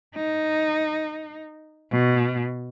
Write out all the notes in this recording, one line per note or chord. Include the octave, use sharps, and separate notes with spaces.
D#4
B2